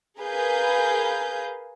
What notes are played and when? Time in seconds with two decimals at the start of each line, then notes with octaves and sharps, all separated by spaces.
0.19 G#4 A#4 B4 F5 G#5 G6